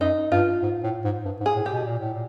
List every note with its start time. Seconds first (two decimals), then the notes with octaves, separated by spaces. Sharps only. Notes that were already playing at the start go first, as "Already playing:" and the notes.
0.01 F#2 D#4
0.32 G2 F4
0.63 G#2
0.84 A2
1.04 G#2
1.25 G2
1.40 G#2
1.46 G#4
1.56 A2
1.66 G4
1.71 B2
1.85 A#2
1.99 A2
2.13 A#2